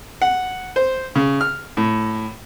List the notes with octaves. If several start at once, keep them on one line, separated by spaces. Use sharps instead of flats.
F#5
C5
C#3
F6
A2